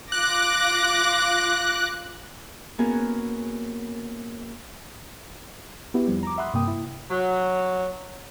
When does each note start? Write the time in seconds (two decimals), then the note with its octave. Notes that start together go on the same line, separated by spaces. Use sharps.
0.12 F4 D6 F#6 A#6
2.78 A#3 B3 C#4 F#4 G#4 A#4
5.94 B3 E4 F#4 G4
6.08 F2 F3 G3
6.23 A#5 D6
6.38 E5 F#5 B5 C6 D#6 F#6
6.53 G2 C3 A#3 G5 D#6
6.67 E4
7.10 F#3